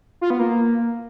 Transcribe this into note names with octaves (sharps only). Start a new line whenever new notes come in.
F4
B3
A#3